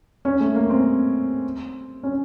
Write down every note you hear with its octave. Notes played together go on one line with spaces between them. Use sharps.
C#4
A3
A#3
C4
C#4